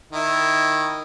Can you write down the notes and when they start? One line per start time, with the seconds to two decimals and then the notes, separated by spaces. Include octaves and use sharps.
0.12 D#3 E4